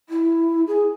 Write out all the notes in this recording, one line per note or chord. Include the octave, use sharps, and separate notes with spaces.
E4
G#4